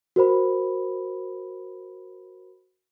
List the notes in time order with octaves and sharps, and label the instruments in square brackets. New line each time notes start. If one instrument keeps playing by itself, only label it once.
[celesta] F#4 A#4 C5 B5